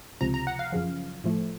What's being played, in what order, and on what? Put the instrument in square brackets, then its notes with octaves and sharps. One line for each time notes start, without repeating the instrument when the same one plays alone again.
[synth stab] C#2 C3 F3 A#5
A#5
F#5
F5
F#2 C#3 F3
A2 F3 A3